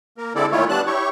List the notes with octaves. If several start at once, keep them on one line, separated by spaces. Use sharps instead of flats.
A#3 A#4
D3 G#3 C4 E4 A4 D5
A#2 D#3 A3 E4 F4 C#5
G3 B3 D4 A5 F#6
E4 G4 C#5 C#6